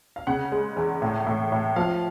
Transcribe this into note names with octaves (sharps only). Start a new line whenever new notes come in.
F5
C#3 F#5
G#3
E2
A2
A2
A2
F3 F5